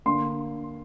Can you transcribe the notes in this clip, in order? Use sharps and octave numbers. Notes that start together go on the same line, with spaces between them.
D3 A#3 D4 C6